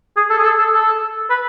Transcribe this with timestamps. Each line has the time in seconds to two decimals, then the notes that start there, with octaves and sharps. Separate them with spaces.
0.17 G#4
0.30 A4
0.39 G#4
0.44 A4
0.58 A4
0.73 A4
1.30 B4